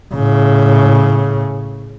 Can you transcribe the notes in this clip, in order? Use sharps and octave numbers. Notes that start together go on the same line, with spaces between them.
A2 C#3